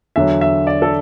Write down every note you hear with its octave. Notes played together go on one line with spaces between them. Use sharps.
E2 D3 F#3 E5
E5
D5
A4